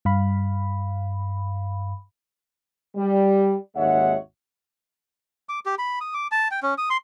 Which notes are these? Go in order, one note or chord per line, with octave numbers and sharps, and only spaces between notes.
G2 F5 B5
G3
G#1 D#2 G#3 C#5 E5 F#5
D6
G4
B5
D#6
D6
A5
G5
C#4
D#6
C6